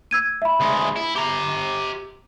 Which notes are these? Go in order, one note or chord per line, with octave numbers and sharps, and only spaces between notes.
E6 G#6 D#7
E5 B5
D2 G#3
E4
G4 A#5